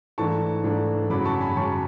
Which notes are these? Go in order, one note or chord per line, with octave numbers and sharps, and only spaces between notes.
G#2 E3 A3 D4 A5 C#6
G#2 E3 A3 D4
F#2 C#3 F#3 B5 D6
A5 C#6
G#5 B5
F#2 C#3 F#3 A5 C#6